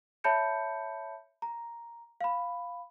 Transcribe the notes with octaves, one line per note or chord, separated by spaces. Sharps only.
C#5 E5 A5 B5 G6 C#7
A#5
F5 B5